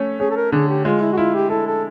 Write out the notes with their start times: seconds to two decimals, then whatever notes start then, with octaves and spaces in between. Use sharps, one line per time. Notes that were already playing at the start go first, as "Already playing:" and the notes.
Already playing: A3 C#4
0.20 C#4 G#4
0.31 A4
0.36 A#4
0.52 D3 G#4
0.69 G4
0.85 G#3 F4
1.01 E4
1.13 F#4
1.17 E4 F4
1.34 G4
1.50 E4 A4
1.66 A4